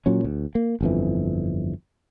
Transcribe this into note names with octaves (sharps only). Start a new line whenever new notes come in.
A#2 F#3 C#4
D2
A#3
G1 F2 E3